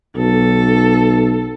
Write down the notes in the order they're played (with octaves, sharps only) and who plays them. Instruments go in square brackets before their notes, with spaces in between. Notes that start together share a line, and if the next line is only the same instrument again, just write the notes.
[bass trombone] B1 [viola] A4